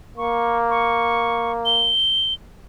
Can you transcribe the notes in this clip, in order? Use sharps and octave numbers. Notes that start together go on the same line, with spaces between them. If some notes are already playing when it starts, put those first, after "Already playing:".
A#3 C#6
C#6
G7